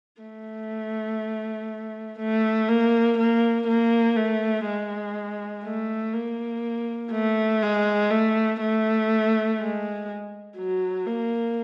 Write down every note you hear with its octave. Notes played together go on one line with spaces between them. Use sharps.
A3
A3
A#3
A#3
A#3
A3
G#3
A3
A#3
A3
G#3
A3
A3
G#3
F#3
A#3